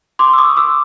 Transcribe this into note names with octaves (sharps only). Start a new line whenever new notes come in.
C6 D6
E6
C#6 D#6
D6 E6